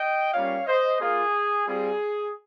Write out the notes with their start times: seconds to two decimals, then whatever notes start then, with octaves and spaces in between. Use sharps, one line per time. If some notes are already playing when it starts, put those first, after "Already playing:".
Already playing: D#5 G5
0.33 G3 A#3 C#4 F4 C#5 F5
0.67 C5 D#5
1.00 A#3 F4 G#4
1.66 G3 C4 F4 G#4